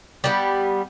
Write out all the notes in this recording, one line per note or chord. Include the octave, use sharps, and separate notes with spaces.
G3 A#3 B3